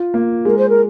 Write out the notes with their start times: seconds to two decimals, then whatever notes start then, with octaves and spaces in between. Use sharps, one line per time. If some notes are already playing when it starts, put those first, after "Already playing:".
Already playing: F4
0.14 A#3
0.45 G#3 A#4
0.57 C5
0.69 A#4